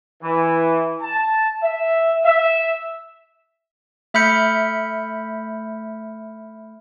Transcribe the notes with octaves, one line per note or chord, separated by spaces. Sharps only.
E3
A5
E5
E5
A3 E5 B5 F6 G6 C#7